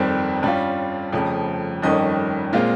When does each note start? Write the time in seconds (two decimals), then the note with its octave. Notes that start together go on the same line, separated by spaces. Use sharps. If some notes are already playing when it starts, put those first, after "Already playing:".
Already playing: G1 F2 D#3 G3 C4
0.43 G2 G3 C#4 F4
1.13 F1 F2 C#3 F3
1.82 G1 F2 D#3 G3 C#4 D#5
2.53 A#2 G#3 C4 F4